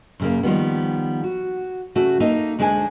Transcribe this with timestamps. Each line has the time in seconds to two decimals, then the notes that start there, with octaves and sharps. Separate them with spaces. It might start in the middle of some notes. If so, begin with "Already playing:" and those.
0.20 F#2 C#3 A#3
0.43 D#3 F3 G3 B3
1.24 F#4
1.95 C#3 A3 F#4
2.20 A3 A#3 D#4
2.59 D2 G#3 D4 C5 C#5 G#5